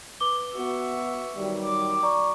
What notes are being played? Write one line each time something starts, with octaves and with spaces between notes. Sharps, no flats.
B4 D6 G7
B3 F#4 E5 C#6
D#3 F#3 G3
D6
D5 A#5 C#6